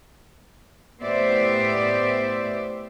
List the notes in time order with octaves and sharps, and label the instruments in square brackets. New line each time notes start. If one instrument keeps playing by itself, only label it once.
[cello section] A2 B3 G4 C5 D5 E5